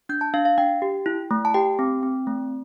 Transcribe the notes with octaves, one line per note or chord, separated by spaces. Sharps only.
D4 G6
A5
D4 F5
F5
D4 G5
G4
E4
A3
A5
G4 G5
C4
C4
A3